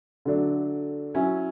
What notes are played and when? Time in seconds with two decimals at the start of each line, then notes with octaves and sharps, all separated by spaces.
0.25 D3 F#3 A3 D4
1.14 F#3 C#4 E4